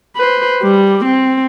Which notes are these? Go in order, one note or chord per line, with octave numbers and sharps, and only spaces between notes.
B4 C5
G3
C4